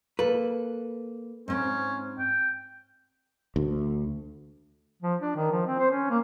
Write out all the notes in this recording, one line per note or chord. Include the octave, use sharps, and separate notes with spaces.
A#3 A4 B4
G#2 C4 C#4
G5
D2
F3
D4
D#3
F3
C4
C5
C#4
A#3